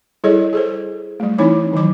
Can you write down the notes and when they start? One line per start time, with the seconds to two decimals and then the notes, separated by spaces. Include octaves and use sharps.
0.24 G3 E4 G#4 A4 C#5 D#5
0.53 G#4 A4 C5
1.20 G3 A3
1.38 E3 C4 D#4 E4 C#5 D6
1.73 D#3 E3 F#3 D6